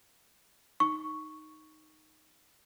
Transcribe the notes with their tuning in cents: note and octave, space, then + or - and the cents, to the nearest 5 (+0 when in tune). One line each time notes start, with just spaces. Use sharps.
D#4 +0 C#6 +0